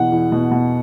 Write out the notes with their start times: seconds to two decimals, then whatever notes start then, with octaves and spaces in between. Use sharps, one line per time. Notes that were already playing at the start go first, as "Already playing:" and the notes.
Already playing: E2 B2 F#5
0.12 E2
0.32 B2
0.51 B2